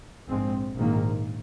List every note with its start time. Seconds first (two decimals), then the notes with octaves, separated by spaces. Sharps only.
0.28 A#1 G#2 G#3 C4
0.76 A#1 G#2 D#3 A#3